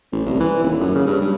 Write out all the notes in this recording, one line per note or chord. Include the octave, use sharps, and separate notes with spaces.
A1
C2
E3
D#1
F#2
C#3
G2
G2